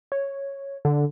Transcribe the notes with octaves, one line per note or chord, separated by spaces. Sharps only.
C#5
D3